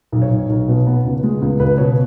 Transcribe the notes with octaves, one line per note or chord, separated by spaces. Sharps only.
B1
C#5
B1
B1
B2
B3
C#2
G#3
C#2
C#2 B4
B2 C#5